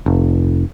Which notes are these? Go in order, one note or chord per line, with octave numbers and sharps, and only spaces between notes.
F1